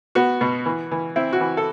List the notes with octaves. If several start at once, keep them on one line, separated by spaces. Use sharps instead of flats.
B3 F#4
B2
E3
E3
C4 E4
F#4
E3
A4